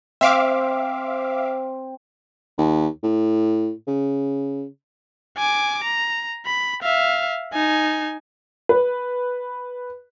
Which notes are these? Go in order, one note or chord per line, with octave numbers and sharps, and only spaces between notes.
C4 E5 F5 D6
D#2
A2
C#3
G#5 D6
A#5
B5
E5 F5
D#4 G#5
B4